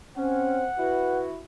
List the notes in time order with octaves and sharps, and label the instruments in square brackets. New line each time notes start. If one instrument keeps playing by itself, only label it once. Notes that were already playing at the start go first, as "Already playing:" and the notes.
[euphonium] C4 [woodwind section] C#4 [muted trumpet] F#5
[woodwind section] E4 F#4 [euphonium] B4